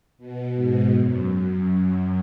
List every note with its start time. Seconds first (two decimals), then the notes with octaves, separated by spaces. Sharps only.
0.18 B2
0.55 G#2
0.92 F#2